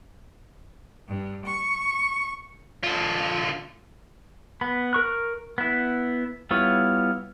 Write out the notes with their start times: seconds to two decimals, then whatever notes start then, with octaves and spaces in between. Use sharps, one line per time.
1.06 G2
1.43 C#6
2.84 D3 F4
4.61 B3 B5
4.93 A#4 C#6 F#6
5.58 B3 E4
6.51 G3 B3 E4 F4 C#5